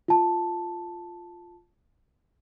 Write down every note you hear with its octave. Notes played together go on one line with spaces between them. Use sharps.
F4 A5